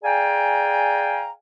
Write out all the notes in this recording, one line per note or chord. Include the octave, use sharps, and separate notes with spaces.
G#4 D5 F5 G5 G#5 A#5